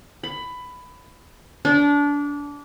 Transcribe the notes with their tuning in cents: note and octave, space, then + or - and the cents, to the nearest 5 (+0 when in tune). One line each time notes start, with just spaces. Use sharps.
B5 +15
D4 -25